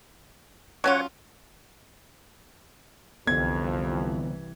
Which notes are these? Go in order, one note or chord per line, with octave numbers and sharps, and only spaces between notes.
F#3 C#4 F4 C#5 F#5
C2 F2 D3 E3 B3 G#6